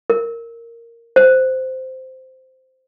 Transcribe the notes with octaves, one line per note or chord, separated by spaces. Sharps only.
A#4
C5